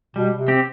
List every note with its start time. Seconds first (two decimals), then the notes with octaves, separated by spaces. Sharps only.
0.16 B2 G3
0.37 C3
0.48 C4 G4